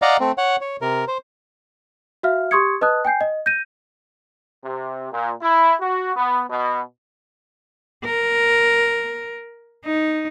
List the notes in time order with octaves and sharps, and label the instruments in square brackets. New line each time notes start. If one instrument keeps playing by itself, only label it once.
[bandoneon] D5 D#5 F5 F#5 A#5
A3 C4
C#5 F#5
C#5
C3 A#4
C5
[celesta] F#4 E5 F5 F6
G4 C6 C#6 D#6 G#6 C#7
B4 D#5 A5 D#6 F#6
G5 G#5 G6 C7
D#5
G6 A#6 D#7
[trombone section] C3
A#2
E4
F#4
B3
B2
[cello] A#4
D#4